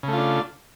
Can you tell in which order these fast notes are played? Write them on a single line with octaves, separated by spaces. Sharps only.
C#3 A3 F4 D4